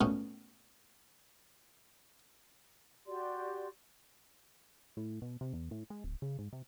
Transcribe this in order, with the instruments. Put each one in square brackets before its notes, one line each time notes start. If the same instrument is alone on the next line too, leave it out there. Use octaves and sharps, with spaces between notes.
[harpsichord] A#2 A3 B3 C#4 D#4 F#4
[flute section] F#4 G4 D5 C6
[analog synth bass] A2
B2
C3
E2
A2
G#3
D1
C#3
G#2
C3